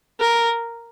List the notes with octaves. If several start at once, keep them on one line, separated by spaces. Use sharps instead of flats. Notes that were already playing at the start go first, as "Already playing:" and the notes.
A#4